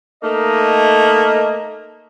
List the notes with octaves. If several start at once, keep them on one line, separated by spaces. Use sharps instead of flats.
A3 A#3 D#4 D#5